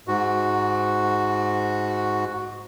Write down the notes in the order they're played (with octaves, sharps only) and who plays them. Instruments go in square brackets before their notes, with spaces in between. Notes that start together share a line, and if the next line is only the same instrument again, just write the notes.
[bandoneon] G#2 F#4